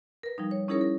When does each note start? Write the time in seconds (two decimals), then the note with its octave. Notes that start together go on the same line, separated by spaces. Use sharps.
0.23 A#4 B4
0.38 F3 G3 D#4
0.51 C#5
0.68 C#4 D#4 E4 G#4 A#4 C#5
0.81 A#4